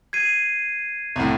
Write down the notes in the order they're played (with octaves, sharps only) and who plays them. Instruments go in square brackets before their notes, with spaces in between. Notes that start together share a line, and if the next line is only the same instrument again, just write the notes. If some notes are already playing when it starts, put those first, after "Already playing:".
[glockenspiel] G#6 C7 D#7
[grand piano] C2 A2